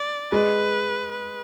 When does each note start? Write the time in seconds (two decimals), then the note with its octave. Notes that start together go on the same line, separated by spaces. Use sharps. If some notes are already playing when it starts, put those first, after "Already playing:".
Already playing: D5
0.32 G#3 B4
1.11 B4